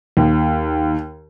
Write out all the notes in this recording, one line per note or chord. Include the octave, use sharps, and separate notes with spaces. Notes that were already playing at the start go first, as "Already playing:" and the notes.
D#2